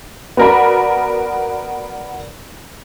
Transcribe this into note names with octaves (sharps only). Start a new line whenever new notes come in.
B3 F#4 A#4 D5 B5